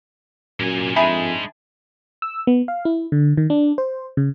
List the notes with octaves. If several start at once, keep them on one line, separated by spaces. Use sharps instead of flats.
F#2 A#2 G#5
F2 G#3 D4 D#4 E5 G#5 B5
E6
B3
F5
E4
D3
D#3
D4
C5
C#3